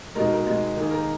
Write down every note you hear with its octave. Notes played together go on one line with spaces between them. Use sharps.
B2 G#3 D#4 A#4
A#4
B2 G#3 D#4
D#3 A#3 D#4 G#4
A#4